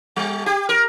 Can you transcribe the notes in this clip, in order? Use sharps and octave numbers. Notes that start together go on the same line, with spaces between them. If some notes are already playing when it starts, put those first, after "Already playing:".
G3
G4
A#4